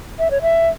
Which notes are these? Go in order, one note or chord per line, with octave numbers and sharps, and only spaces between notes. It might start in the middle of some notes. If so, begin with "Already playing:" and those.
E5
C#5
E5